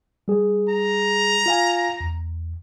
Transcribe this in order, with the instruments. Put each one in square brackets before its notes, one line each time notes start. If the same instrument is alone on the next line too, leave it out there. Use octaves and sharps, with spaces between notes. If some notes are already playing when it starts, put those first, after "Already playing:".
[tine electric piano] G3 G#4
[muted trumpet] A#5
[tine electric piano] F4 F5 G#5
E2